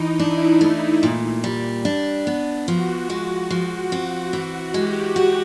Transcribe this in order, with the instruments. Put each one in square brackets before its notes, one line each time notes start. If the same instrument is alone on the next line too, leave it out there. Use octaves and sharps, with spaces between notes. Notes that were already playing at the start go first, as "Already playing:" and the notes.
Already playing: [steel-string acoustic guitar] E3 [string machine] D#4
[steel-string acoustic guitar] D4 [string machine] E4
[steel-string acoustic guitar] A3
A#2
G3
D4
B3
[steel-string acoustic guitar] F3 [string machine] F#4
[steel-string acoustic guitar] G#3
[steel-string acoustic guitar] F3 [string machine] F#4
[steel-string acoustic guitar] C4 [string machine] F#4
[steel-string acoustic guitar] E3 [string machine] F#4
[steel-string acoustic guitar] G#3 [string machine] G4
[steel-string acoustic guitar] F#4